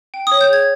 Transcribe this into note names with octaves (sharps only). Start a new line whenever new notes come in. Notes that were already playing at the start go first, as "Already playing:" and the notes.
G5
D#6
C#5
G6
G#4 G#6